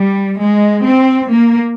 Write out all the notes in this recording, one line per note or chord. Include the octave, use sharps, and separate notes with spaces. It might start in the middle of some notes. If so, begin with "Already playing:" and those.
Already playing: G3
G#3
C4
A#3